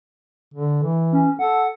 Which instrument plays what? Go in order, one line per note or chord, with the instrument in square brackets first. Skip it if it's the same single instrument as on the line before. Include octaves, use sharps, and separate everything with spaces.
[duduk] D3
E3
[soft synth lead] C#4
[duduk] A4 [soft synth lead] F#5